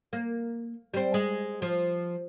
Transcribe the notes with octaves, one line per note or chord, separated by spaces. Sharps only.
A#3
G3 C4
G#3
F3